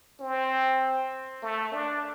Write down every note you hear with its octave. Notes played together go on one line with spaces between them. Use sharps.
C4
A3
D4